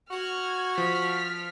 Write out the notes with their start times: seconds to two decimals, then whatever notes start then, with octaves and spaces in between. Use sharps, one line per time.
0.11 F#4 F6 G#6
0.78 F3 F6 B6